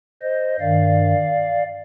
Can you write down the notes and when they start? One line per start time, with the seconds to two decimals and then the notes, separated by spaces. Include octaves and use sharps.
0.22 C5 D#5
0.60 G2 D#3 D5 F5